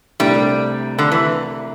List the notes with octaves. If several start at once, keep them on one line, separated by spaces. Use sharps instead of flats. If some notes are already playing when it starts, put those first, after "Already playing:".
C2 C3 G3 A3 D4
D3
E3